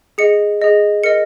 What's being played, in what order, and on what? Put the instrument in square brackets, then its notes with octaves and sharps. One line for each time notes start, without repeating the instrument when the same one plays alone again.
[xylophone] G#4 D#5 C#7
G#4 D#5
A#4 D#5 C#7